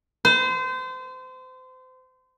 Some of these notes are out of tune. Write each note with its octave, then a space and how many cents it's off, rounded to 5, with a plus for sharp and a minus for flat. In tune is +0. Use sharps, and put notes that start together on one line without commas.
C5 -30